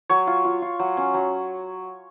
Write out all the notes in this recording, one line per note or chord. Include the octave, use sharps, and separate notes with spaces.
F#3 C#5
F4
F4
F4
F#3
C#4
F#3